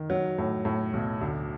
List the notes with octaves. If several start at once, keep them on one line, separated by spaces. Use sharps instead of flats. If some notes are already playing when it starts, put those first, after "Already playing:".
Already playing: D#3
F#3
A2
A2
B1
D2